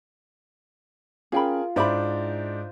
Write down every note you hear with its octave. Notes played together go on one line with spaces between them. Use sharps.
C#4 F4 G#4 A#4 G5 B5
G#2 D4 E4 C5 E5 B5 D6